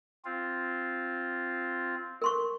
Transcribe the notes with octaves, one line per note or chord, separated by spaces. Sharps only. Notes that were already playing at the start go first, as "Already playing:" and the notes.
C4 F4
A#4 C6 C#6